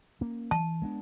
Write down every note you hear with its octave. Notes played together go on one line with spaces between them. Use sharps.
A#3 C#4
E3 A5
G#3 B3 D4